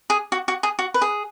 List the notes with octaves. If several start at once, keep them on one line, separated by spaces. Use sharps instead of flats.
G#4
F#4
F#4
G#4
F#4
B4
G#4